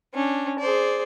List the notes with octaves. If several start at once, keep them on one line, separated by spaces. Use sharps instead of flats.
C#4 D4
G#4 C5 D5